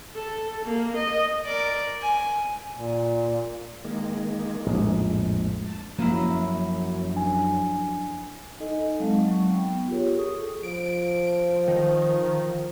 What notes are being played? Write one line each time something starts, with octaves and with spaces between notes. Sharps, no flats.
A4
A#3
D#5
A#4 D5
G#5
A#2
D#3 G#3 A#3
A#1 F2 A2 G#3
A5
F#2 F3 F#3 A#3 E4
D4 G#5
D#4 A4 D#5 G#5
F#3 G#3 C4 D#4 F5 A5
F#3 C#6
B3 G5
F4 G4 G#4 A#4 C#5
G#4 A4 C#6 D#6
F3 D7
D#3